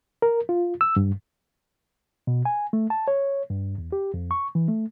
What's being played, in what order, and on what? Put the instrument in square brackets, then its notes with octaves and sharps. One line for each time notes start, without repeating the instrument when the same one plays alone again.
[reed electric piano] A#4
F4
E6
G2
B2
G#5
A3
A5
C#5
G2
E2
G4
F2
C#6
E3
A3